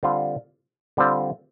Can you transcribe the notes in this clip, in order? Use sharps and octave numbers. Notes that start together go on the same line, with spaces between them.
D3 G3 C4 F4
D3 G3 C4 F4